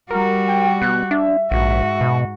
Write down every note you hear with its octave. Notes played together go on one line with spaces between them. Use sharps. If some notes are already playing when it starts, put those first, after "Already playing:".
G3 F#4 A#4
G5
B2 F#6
D4 E5
A#1 G#2 F#4
B2